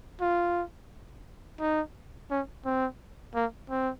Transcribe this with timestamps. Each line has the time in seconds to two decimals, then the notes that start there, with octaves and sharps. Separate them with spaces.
0.21 F4
1.60 D#4
2.30 C#4
2.65 C4
3.35 A#3
3.70 C4